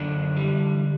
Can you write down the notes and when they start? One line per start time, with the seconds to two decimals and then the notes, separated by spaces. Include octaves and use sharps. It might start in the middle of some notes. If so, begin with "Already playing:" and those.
Already playing: F#2 D3 D4
0.37 E3 G3